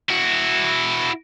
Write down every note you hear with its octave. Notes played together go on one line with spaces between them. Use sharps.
E4 F#4